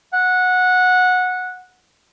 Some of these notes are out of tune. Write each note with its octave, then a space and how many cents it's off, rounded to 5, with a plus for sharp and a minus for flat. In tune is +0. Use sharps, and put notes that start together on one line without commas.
F#5 -15